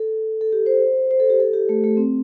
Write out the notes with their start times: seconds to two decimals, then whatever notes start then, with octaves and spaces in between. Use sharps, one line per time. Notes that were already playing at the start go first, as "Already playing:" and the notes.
Already playing: A4
0.41 A4
0.53 G4
0.66 C5
1.11 C5
1.20 A4
1.30 G4
1.40 A4
1.54 G4
1.69 A3
1.84 A3
1.97 C4